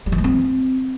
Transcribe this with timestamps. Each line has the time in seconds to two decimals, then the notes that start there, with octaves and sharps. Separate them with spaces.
0.06 G3
0.12 E3
0.18 G#3
0.24 C4